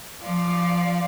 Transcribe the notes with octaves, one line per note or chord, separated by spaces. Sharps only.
F3 D5 F5